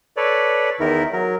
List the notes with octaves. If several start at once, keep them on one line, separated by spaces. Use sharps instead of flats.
A4 B4 C#5 D5
E2 D#3 E4 A#4
F#3 A#4